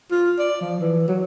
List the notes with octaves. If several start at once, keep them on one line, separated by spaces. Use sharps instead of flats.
F4
D5
F3
E3
F#3